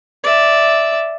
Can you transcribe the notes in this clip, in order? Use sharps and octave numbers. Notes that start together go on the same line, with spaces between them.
D5 E5